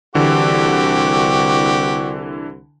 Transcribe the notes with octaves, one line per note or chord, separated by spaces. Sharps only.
C2 D3 E3 F#4 G4